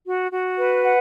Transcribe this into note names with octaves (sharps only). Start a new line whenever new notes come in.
F#4
F#4
B4
F#5